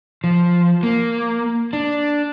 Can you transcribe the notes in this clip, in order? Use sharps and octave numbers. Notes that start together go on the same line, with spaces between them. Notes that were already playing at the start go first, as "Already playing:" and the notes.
F3
A#3
D4